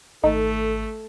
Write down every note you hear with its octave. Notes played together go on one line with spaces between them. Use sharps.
G#1 A3 D#4 A4